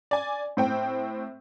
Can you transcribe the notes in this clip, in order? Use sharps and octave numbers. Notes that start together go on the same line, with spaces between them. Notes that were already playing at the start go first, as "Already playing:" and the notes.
D5 G#5
A2 C4 G5